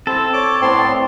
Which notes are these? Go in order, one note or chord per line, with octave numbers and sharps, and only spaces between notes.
C4 E4 A4
C#5 D5 A5 D6
A2 B3 C4 C6